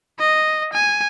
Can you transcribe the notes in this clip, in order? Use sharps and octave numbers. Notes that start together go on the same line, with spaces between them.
D#5
G#5